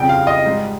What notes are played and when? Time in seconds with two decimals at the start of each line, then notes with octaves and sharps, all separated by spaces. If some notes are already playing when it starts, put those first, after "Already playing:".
Already playing: F2 C#3 G3 G5
0.09 F5
0.27 D#5
0.45 G#2 G3